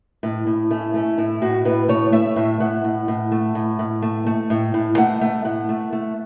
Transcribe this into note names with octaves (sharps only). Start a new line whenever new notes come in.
A2
A2
A3 C#4
A3 C#4
A2 E4
A2 F#4
A2 B4
A3 C#5
A3 E5
A2
A2 F#5
A2
A2
A3
A2
A2
A3
A3
A2
A2
A3 F#5
A3
A2 F#5
A3
A3